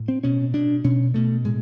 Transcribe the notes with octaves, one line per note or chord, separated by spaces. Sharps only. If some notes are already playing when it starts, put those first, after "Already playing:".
Already playing: A2
C4
B2 C#4
B2 D4
B2 C#4
B2 A3
A2 G#3